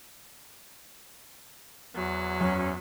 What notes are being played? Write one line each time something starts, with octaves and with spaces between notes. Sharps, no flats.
E2 F#3
F#2 C#4